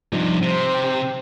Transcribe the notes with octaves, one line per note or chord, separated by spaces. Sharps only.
G2 C3 F3 G3 D#4
C3 C5
G5